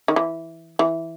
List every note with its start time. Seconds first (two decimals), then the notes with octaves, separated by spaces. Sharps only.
0.08 D#3
0.16 E3
0.79 E3